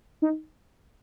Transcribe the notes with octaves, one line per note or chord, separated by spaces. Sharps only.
D#4